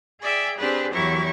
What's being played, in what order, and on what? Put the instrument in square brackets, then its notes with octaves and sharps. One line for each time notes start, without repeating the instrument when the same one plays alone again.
[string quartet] G#4 D5 E5 G5
C4 D4 G4 G#4 B4
E2 F#3 E4 G4 A#4 C#6